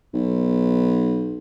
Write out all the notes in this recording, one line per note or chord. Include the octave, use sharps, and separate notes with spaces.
B1